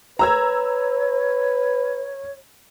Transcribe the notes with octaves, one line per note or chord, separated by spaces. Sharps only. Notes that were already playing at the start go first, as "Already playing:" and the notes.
B4 C#5 A#5 E6 G#6